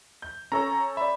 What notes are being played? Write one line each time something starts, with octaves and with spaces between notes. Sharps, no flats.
G6
C#4 A4 C#5 A#5
D5 E5 B5